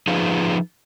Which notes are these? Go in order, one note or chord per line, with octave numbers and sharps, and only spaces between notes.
F3 D#4 F4 G#4 B4